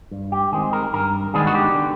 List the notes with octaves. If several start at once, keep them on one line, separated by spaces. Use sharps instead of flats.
G2
G4
D#3 G#3 C4 G#4
A#4
G2 A#4
D#3 G#3 B3 D4 G#4
F#4
G4
D3